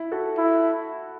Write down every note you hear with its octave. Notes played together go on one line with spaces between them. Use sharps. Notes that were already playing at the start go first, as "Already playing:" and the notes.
Already playing: E4
F#4 A4
E4